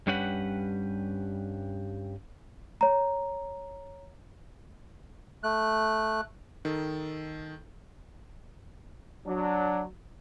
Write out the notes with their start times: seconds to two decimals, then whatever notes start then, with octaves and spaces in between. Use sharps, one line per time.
0.07 G2 G3 C#4 G4 B4 F#5
2.81 C#5 A#5
5.43 A3 F#6
6.65 D#3 A4
9.25 F#3 D4